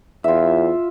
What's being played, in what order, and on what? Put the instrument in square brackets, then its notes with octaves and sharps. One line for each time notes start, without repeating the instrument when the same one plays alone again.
[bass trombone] E2 [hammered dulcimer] F4 E5